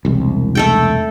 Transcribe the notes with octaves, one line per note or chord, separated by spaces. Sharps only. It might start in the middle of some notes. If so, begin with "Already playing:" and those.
E1 C2
A3 A4 G5